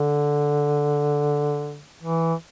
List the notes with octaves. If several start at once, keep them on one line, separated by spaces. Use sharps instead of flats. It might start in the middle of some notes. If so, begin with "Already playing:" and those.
Already playing: D3
E3